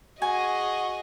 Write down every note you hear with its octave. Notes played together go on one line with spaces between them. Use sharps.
F#4 G#4 D#5 G#5